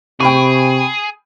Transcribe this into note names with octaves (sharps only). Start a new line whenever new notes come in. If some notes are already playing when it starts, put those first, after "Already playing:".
C3 G#4 G5 B5 C#6